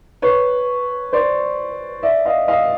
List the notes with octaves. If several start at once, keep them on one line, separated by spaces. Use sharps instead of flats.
B4 C#5
C5 D5
D5 E5
D#5 F5
D#5 F5